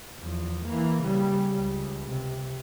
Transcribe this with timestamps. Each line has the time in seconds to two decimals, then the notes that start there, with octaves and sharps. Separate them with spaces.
0.20 E2 F3
0.64 E3 A#3
1.02 C#3 G3
1.61 C#2
2.05 C3